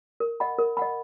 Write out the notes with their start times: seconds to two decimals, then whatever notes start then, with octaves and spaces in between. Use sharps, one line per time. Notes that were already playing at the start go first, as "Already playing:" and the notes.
0.20 A#4
0.40 D#5 F#5 B5
0.58 A#4
0.77 D#5 F#5 B5